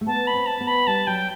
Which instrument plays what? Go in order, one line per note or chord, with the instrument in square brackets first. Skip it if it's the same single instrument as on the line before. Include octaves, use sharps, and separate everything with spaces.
[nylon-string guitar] A3
[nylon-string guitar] B3 [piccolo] A5
[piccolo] B5
[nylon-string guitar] C4
[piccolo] A5
[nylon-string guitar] B3
[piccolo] B5
[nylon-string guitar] G3 [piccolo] A5
[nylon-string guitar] F#3 [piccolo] G5